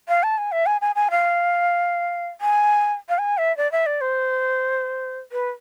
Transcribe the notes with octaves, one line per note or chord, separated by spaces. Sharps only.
F5
A5
G#5
E5
G#5
G#5
G#5
F5
G#5
F5
G#5
E5
D5
E5
D5
C5
B4